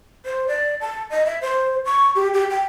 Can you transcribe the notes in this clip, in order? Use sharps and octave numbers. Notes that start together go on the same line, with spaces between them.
C5
D5
A5
D#5
E5
C5
C#6
G4
G4
G5